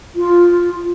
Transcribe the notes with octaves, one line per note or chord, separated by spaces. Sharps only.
F4